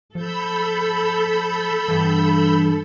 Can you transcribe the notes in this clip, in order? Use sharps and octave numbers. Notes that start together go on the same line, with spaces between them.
F3 A4 B5 E6 G6
E2 G2 E3